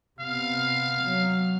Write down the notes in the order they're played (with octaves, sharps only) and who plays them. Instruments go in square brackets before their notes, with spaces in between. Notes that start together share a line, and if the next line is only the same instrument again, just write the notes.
[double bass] C3 B3 [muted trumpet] F5
[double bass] F#3